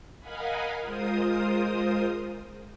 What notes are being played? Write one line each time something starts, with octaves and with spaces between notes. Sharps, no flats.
A#4 D#5 F5 F#5 G#5 B5
G#3 F4 A#4 C5 D#6